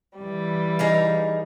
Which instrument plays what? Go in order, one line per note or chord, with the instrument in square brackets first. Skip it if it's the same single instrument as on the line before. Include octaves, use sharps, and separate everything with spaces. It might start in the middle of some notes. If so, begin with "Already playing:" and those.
[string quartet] E3 G3
[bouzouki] D#4 G#4 F5